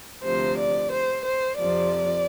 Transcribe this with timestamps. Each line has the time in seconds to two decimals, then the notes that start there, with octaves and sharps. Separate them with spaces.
0.23 D2 C3 F3 C5
0.58 D5
0.91 C5
1.25 C5
1.59 F2 C3 F3 D5